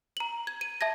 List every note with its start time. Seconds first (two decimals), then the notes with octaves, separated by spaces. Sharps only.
0.17 A#5 F#7
0.47 G#6
0.61 D#7
0.81 E5 A5 G#6 A#6